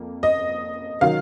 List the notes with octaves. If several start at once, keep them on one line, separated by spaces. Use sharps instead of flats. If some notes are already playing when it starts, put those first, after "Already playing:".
Already playing: F2 A#3
D#5
D#3 F#3 F5